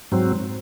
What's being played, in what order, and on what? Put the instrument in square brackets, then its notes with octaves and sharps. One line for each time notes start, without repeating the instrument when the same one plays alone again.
[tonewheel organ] G#2 F#3 C4